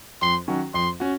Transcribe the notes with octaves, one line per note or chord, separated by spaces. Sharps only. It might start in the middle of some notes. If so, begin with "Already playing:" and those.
F2 C6
D#3 F#3 C#4 F#4
F2 C6
C#4 F#4